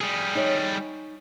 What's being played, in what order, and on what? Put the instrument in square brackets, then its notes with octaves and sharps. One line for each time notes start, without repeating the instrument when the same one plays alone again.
[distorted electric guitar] G3 G#4
[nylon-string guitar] D#4 C#5